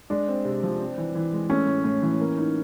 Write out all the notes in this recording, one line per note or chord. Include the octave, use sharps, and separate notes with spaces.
G#3 D4
C4
C3
F3
C4
E3
E3
G#3
A3 C#4
A2
A2
E3
A#3
D#4